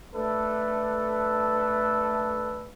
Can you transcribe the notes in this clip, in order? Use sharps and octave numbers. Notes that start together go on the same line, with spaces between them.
A3 D4 A4 B4